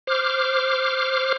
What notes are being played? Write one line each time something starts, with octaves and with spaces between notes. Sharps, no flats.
C5 D6 F6